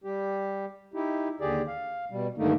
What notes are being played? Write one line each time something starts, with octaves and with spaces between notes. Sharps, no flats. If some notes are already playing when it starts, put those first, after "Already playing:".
G3 G4
D#4 E4 G4
D#2 D3 G4 G#4 D5
F5
B2 G3
G2 D3 D#3 A3 A#3 D#4